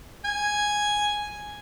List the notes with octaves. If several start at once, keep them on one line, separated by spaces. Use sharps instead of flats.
G#5